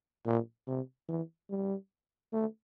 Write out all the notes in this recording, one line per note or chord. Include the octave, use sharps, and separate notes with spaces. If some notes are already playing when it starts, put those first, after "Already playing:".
A#2
C3
E3
G3
A3